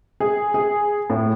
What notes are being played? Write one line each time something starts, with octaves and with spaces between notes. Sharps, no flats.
G#4
G#4
A2